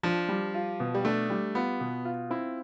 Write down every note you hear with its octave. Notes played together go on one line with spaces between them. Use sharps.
F3 D4
G3
F4
B2
G3
A3 D4
G3
B3 F4
B2
F4
C4 E4